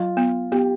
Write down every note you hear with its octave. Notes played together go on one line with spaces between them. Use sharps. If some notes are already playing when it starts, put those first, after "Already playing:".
Already playing: F#3 F4
B3
B3 G4